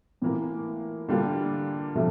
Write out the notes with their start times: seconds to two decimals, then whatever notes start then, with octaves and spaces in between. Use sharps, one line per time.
0.22 A2 E3 A#3 F4 A#4
1.09 D3 G3 A#3 F4
1.95 C3 F3 A3